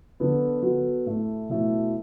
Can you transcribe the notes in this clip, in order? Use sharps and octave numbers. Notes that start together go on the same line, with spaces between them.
D3 F#3 B3 F#4 A4
F#3 B3 F#4 A4
A2 A3 E4 A4
B2 F#3 A3 E4 A4